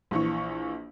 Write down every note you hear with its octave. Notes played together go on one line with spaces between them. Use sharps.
A#1 E3 C#6